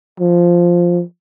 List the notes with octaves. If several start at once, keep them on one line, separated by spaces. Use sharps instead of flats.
F3